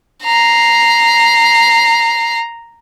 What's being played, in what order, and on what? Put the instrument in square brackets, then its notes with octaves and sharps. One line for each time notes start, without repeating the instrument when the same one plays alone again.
[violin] A#5 C7